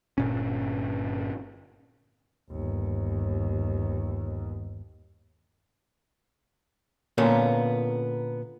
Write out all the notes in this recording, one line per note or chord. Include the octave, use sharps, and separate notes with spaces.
G1 A#2 C#4
G1 D#2
A#2 D3 A#3 B3 C#4